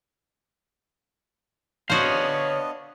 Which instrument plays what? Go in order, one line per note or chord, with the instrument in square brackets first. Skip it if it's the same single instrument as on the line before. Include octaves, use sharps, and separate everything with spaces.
[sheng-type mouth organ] B3 D4 D#5 [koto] F#4 C5 [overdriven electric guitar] C#5 F5